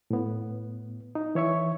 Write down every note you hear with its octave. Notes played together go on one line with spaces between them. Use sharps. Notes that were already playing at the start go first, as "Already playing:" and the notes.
A2 B3
D#4
E3 C#5 E5 C#6